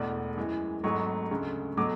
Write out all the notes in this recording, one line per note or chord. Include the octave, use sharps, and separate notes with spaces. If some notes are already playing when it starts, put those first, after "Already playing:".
Already playing: E1 E2 B2 A3 D5
F#2 E3 G#3
G#1 G#2 F#3 A3 C#6
D2 C#3 G#3
B2 F#3 A3 D6